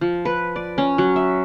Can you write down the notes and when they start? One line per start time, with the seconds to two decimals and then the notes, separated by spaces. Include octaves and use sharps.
0.01 F3
0.25 B4
0.56 D5
0.78 C#4
0.98 F#3
1.16 E5